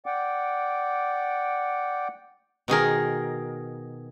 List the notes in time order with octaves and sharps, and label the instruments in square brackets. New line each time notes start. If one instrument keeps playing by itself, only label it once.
[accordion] D5 F#5 G5 D6
[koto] B2 D#3 G#4 A#4